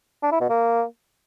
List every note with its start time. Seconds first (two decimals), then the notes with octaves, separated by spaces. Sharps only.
0.23 D4
0.32 E4
0.41 B2
0.50 A#3